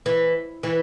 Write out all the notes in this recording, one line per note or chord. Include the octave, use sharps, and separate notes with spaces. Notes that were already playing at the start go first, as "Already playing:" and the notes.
E3
E3